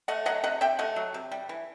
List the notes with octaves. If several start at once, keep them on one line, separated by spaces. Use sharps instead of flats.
A3 D#5 F#5
F#3 D#5 F#5
C3 D#5 F#5
C3 E5 G5
A3 D#5 F#5
F#3
C3
G3
E3